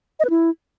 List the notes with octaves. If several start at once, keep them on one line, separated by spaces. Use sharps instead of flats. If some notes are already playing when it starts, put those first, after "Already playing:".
D#5
B4
E4